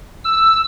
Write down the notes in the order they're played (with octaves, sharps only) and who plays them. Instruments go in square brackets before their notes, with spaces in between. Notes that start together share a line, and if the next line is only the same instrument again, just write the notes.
[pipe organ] E6